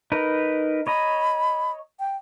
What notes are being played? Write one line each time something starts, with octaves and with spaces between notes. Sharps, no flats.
D#4 A#4 B4
C#5 D#5 A#5 B5
G5